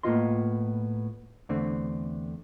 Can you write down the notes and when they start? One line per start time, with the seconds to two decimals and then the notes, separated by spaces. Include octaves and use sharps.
0.03 A2 A#3 B3 F4 D#5 C6
1.49 E2 D3 A3 C4